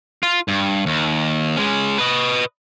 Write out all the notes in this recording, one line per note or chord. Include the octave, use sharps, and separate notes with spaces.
F4
G2
D#2
G#3 C#4
B4 D#5